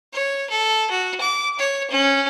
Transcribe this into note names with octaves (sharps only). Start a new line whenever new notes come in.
C#5
A4
F#4
D6
C#5
C#4